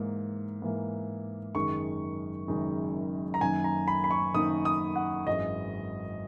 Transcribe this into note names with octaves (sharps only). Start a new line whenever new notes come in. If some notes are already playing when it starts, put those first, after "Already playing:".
Already playing: G#2 E3 A#3
G#2 E3 A#3
F#1 F#2 D#3 G#3 D#4 C#6
F#1 F#2 D#3 G#3 D#4
A#5
F#2 D#3 A#3 D#4 G#5
A#5
B5
B5
C#6
F#2 D#3 A#3 D#4 D#6
D#6
F#5
G#1 F#2 E3 G#3 D#5